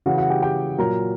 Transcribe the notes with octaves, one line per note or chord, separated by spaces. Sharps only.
C#3 E3 F#4 F#5
F#4 F#5
G4 G5
G4 G5
A#2 F#3 A#4 A#5